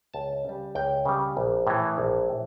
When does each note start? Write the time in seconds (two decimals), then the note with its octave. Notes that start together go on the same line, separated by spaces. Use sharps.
0.14 C#2 A5
0.44 C#3 G3
0.75 C#2 G5
1.06 C#3 G3
1.37 A#1
1.67 A2 E3
1.98 A#1
2.29 A2 E3